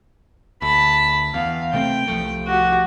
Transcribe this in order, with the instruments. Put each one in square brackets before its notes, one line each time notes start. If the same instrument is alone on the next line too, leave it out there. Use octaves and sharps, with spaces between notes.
[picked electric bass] D2 [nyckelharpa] A5 B5
[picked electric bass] E2 [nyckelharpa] F5
[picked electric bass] C3 A3 C4 [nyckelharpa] G5
[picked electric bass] C2 F3 A3
[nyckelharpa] F#4 G4